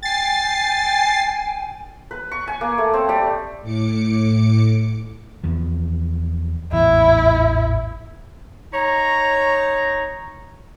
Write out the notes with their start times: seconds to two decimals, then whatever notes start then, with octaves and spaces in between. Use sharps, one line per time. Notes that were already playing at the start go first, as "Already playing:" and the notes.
0.03 G5 G#5 A6 C7
2.11 B4
2.31 C#6
2.48 G#5
2.61 A#3
2.78 A3
2.93 C4
3.09 G3
3.62 A2 D6 C#7
5.44 E2 F3
6.72 A1 E2 G#2 E4
8.73 D#4 C#5 A#5